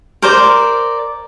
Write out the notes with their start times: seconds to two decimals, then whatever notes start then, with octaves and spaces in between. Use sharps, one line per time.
0.22 A#4 C5 D5